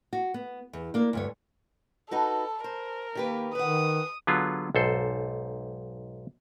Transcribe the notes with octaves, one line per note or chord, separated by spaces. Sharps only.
F#4
B3
E2
A#3 D4
D2 G2 C#5
D#4 F#4 A4 B4 A5 B5
A#4 C5
D#3 A#3 G4 B4
D#3 B4 F#5 D#6
D3 F#3 B3 F4 G#4
B1 G#2 A4 C5